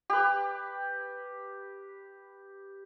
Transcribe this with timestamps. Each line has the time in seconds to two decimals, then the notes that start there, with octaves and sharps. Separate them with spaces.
0.10 G4 B4